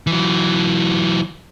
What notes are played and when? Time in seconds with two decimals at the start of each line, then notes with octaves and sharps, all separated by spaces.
0.07 E3 F#3